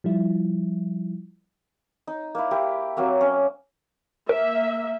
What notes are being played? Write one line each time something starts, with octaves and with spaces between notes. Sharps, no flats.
F3 G3 E4
D#4
A#3 E4
E4 G4 A#4
F#3 A#3 C4
C#4
A#3 A#4 E5